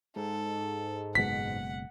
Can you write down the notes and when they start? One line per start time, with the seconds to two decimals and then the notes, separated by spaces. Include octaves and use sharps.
0.16 G#2 A4
1.15 F#1 B2 G#3 F#5 B6